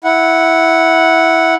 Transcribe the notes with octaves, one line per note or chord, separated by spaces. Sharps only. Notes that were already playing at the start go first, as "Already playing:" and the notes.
E4 F#5